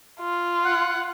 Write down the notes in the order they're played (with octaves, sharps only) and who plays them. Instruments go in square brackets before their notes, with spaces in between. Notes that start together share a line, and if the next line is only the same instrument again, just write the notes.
[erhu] F4
[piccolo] F#5